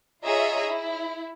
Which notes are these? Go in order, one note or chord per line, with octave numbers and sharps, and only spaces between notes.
F4 G#4 C#5 D#5 E5 A#5
E4